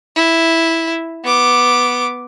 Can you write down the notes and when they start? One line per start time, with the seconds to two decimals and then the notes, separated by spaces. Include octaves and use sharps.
0.16 E4
1.24 B3 D6